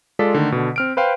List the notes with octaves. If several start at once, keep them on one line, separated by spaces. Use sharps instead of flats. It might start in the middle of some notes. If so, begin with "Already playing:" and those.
G#3 F4 A4 D5 B6
D3 D#3 A3
B2 D3
C4 F6 D7
B4 C5 F5 G5